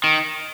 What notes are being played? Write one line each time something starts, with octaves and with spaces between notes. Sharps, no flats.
D#3